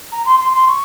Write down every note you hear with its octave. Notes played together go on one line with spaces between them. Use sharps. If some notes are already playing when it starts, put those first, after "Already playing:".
A#5
C6
C6
C6
C#6